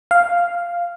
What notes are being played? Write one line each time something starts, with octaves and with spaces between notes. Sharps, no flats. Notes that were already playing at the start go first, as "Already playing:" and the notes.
F5